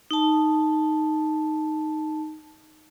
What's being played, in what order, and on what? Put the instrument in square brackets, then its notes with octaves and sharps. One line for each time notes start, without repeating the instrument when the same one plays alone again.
[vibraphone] D#4 A5